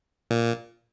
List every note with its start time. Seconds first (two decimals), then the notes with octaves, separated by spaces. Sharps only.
0.31 A#2